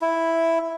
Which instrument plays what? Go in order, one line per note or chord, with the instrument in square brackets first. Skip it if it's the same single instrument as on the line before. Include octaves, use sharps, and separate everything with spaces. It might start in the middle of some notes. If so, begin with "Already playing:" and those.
[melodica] E4